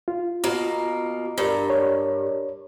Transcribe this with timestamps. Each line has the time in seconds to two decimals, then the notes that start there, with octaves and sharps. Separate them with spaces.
0.08 F4
0.44 B2 A#3 A#5
1.38 G2 A#4 D5 A#5
1.70 C#5